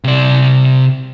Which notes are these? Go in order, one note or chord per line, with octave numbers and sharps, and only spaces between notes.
C3 D5